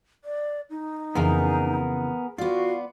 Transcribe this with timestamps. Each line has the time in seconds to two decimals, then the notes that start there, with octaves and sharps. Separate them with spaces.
0.25 D5
0.70 D#4
1.15 F2 C#3 E3 B3 G#4 A#4
2.38 B3 F4 F#4 D5